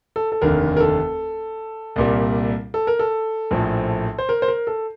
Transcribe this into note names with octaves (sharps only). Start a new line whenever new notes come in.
A4
A4
F1 D#2 D3 A#4
A#4
A4
C2 A#2 G3 A#3
A4
A#4
A4
A#1 A2 F3
C5
A#4
C5
A#4
A4